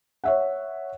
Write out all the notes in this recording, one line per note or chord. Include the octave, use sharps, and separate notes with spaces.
C#5 E5 F#5